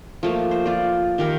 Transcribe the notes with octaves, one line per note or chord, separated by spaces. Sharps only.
F3 A3 A#3
C5
F4 D5
D#3 G4 A#4